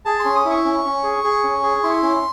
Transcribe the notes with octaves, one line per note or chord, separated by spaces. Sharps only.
G#4 A5
C6
C#4
D#6
E4
C#6
C#4
C#4
G#4
G#4
C#4
G#4
E4 C6
C#4